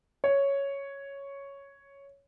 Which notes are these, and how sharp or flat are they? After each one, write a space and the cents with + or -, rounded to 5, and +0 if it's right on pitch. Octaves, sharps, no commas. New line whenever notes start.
C#5 +0